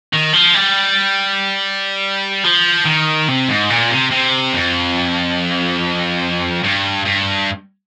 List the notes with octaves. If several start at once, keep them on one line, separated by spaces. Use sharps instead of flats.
D#3
F3
G3
F3
D#3
C3
G#2
A#2
C3
C3
F2
G2
G2